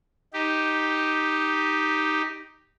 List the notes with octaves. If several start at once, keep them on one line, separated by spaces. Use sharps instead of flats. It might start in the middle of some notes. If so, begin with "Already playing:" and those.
D#4 G4